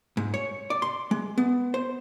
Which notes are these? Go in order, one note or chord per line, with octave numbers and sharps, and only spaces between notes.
G#2
C#5
D5
C6
G#3
B3
C5